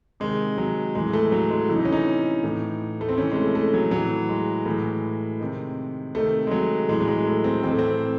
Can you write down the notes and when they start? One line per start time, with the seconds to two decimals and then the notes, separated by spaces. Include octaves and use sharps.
0.20 C3 D#3 G#3
0.58 F#3
0.95 A2 E3 G#3
1.14 A3
1.32 F#3
1.50 G#3
1.69 C3 E3 E4
1.76 D#4
1.85 C#4
1.92 D#4
2.44 A2 E3
3.01 A3
3.09 C4
3.17 C3 E3 C#4
3.32 G#3
3.36 A3
3.55 A3
3.74 F#3
3.91 A2 E3 F#3
4.29 G#3
4.66 A2 E3
5.40 C3 D#3
6.15 C3 D#3 A3
6.47 G#3
6.51 F#3
6.89 A2 E3 G#3
7.00 F#3
7.08 G#3
7.26 A3
7.44 C4
7.63 A2 E3 C4
7.71 A3
7.79 C4